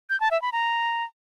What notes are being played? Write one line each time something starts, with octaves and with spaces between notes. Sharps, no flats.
G6
A5
E5
B5
A#5